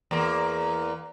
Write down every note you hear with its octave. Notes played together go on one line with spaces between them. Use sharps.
E2 A#3